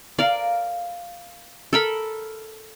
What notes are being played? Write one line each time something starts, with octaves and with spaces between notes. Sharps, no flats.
A#4 D5 F5
A4 A#4 B5